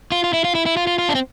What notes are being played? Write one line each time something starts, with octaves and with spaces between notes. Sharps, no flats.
F4
F4
E4
F4
E4
E4
F4
F4
F4
D4
C4